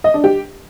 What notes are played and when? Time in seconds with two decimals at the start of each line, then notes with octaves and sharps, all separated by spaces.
0.04 D#5
0.14 D4
0.24 G4